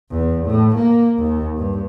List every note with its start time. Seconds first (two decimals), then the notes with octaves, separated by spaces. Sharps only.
0.10 E2
0.46 A2
0.76 A#3
1.17 D#2
1.57 G2